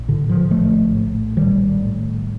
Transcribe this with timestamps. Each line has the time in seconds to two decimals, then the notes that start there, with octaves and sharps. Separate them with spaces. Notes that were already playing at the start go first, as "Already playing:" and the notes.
Already playing: A#1
0.08 A2 D3
0.29 D3 F3
0.51 A#1 F3 A3
0.94 A2
1.37 A#1 D#3 G3
1.81 A2